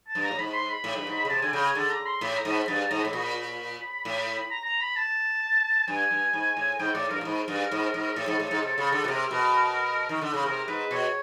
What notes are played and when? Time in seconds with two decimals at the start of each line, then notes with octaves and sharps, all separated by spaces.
0.08 A5
0.15 G2
0.23 A#5
0.31 A2
0.38 G#2 B5
0.54 C6
0.69 B5
0.84 A2
0.96 G2
1.07 G#2
1.25 C#3
1.29 C3 A5
1.42 D3 G#5
1.53 C#3 G5
1.64 G#5
1.75 D3 A5
1.91 A#5
2.06 C6
2.21 A2 B5
2.36 A#5
2.45 G#2
2.52 B5
2.68 G2 A5
2.79 A5
2.90 G#2 A#5
3.02 B5
3.05 A2
3.13 A#2 B5
4.05 A2
4.51 A#5
4.65 A#5
4.81 B5
4.96 A5
5.88 G2 G#5
6.11 G2
6.33 G#2
6.57 A2
6.79 G#2 G5
6.94 A2 D5
7.10 G2 A#4
7.21 A2
7.25 G#2
7.48 G2
7.71 G#2
7.94 G#2
8.16 A2 A4
8.28 G#2
8.40 A2
8.51 G#2
8.63 C3
8.78 C#3
8.92 D3
9.04 B2
9.08 C3 A#4
9.31 B2
10.09 D#3
10.21 D3
10.34 C#3
10.46 C3 A#4
10.68 G#2 B4
10.91 B2 C#5